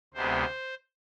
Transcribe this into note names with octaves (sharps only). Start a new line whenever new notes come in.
D2 C3 G#3 B3 C5